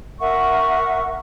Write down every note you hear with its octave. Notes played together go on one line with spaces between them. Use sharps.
A#4 E5 F#5 C#6